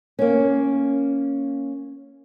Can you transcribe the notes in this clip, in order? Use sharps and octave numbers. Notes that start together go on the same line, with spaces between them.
A#3 C#4